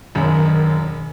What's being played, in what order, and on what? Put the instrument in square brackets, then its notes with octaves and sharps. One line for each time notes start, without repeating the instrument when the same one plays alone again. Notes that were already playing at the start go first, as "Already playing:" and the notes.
[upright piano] E1 F#2 [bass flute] D#3